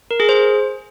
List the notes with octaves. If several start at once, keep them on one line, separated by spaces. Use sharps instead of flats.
A#4
G#4
C5